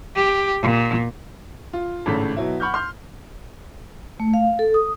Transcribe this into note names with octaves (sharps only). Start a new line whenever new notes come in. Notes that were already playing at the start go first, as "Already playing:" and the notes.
G4
A#2
F4
G#1 A2 C#3 A3 A4 B6
B2 F#3 E4
F#5 B5 C#6 F6 G6
C6 F6 G6
A3
F5
A4
D#6